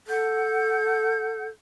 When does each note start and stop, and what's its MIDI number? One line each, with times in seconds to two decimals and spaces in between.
0.07 1.48 69
0.07 1.46 78
0.07 1.46 91